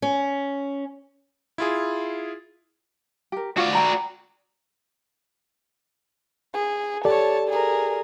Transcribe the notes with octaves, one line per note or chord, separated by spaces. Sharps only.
C#4
E4 F4 G#4
G4 A#4
F4 F#4 D5
G5 A#5 B5
G#4
G4 A4 C#5 D5 A5
G#4 A#4